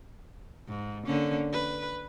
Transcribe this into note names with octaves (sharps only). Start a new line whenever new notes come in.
G#2
D3 A#3 C#4
B4